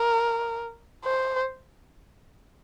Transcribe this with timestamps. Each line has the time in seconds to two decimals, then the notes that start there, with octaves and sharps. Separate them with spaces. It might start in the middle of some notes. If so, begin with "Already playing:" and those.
Already playing: A#4
1.05 C5